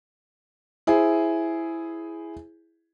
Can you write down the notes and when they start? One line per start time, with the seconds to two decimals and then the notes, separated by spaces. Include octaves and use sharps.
0.87 E4 G#4 C5 E5 G#5